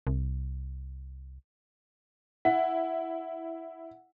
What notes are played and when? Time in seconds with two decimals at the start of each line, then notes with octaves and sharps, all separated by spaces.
0.07 C2
2.45 E4 F#5